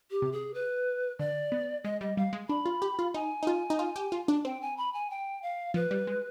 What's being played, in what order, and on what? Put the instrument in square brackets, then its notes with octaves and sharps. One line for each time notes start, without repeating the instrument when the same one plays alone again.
[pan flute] G4
[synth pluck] C3
[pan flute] G#4
B4
[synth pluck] D3 [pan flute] D5
[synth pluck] B3
[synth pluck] G#3 [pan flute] D#5
[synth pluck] G3 [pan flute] D#5
[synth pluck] G3 [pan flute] F5
[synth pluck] G#3
[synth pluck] D4 [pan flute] B5
[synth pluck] F4
G4
F4
[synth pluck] D#4 [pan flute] G#5
[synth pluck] D#4
F4
D#4
F4
G4
F4
D4
[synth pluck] C4 [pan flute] G5
[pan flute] G#5
B5
G#5
G5
F5
[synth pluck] F3 [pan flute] B4
[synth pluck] G3
G#3